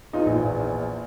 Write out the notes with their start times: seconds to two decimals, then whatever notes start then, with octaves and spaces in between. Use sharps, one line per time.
0.13 E2 D#4 F4
0.26 A#1